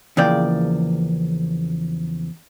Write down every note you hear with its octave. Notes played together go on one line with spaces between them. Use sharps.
E2 C#3 F3 A#3 D5 G5